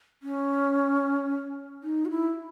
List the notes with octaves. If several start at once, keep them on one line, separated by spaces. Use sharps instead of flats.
C#4
D#4
F#4
E4